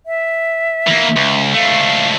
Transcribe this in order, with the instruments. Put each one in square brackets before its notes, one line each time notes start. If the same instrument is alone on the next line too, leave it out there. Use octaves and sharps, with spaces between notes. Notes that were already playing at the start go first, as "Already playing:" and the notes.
[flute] E5
[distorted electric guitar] E3 A#3
C#2
[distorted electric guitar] C#2 A3 [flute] F5